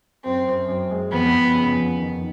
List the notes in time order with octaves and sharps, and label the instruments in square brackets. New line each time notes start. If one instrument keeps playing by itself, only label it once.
[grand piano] F#2 [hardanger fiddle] C4
[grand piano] F#2
F#2
G#3
[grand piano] F2 [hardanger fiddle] B3
[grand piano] F2
C#3
F2
D#3